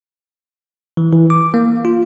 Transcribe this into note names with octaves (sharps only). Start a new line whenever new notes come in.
E3
E3
D6
A#3
F4